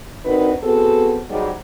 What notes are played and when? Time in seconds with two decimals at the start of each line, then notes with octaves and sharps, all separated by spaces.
0.24 C4 D4 D#4 F#4 A#4 B4
0.63 B3 C4 F#4 G#4 A4 C5
1.29 G#2 F#3 G3